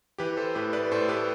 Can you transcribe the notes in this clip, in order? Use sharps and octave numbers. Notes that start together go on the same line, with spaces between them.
E3 G4 B4
A4 C5
A2 G4 B4
B4 D5
A2 A4 C5
G4 B4